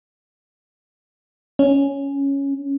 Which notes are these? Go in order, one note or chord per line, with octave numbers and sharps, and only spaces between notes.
C#4